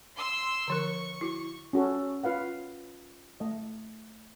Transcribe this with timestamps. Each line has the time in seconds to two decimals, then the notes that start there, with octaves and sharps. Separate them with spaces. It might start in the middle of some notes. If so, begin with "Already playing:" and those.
0.17 C6 E6
0.68 D3 F3 A#4 C#6
1.21 E4 F#4
1.73 C#4 F#4 A4
2.24 F4 B4 F5 F#5
3.40 A3 D#5